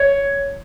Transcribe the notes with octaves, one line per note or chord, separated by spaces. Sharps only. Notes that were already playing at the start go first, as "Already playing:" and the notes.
Already playing: C#5